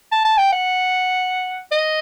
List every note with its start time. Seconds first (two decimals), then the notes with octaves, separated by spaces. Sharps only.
0.12 A5
0.25 A5
0.38 G5
0.53 F#5
1.72 D#5